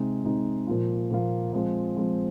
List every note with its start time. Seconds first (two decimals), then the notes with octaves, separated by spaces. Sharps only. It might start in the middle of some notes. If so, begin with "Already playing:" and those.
Already playing: C3 G#3 D#4
0.25 C3 G#3 D#4
0.67 A#2 F3 A#3 F4
1.11 A#2 F3 A#3 F4
1.53 F3 G#3 C4 F4
1.96 F3 G#3 C4 F4